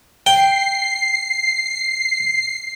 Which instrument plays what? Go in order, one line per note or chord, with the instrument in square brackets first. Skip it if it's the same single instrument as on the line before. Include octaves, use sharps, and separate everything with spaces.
[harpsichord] G5 [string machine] C7